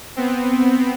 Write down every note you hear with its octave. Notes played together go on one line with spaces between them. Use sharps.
B3 C4